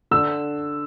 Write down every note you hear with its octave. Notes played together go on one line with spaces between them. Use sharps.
D3 E6